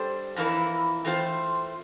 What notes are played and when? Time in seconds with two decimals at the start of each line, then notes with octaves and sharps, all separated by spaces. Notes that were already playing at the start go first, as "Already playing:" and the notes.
Already playing: G3 D4 A4 C5
0.36 F2 E3 A#3 E4 A#4
1.05 E3 A3 C4 F4 C5